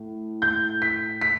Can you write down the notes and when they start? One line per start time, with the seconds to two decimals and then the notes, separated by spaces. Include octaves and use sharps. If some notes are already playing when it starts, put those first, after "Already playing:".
Already playing: A2
0.42 G6
0.82 B6
1.21 B6